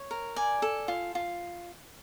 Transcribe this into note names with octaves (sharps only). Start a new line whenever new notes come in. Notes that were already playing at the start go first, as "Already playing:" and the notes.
Already playing: C#5
A#4
D5 G#5
A4
F4
F4